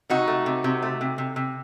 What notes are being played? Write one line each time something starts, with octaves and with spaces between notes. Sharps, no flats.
C3 D#4 F#4
A3
C3
C3
A3
C3
C3
C3